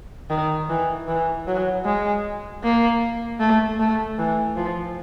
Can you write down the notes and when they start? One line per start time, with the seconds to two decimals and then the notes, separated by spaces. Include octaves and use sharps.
0.30 D#3
0.69 E3
1.08 E3
1.47 F#3
1.85 G#3
2.64 A#3
3.40 A3
3.80 A3
4.18 E3
4.56 F3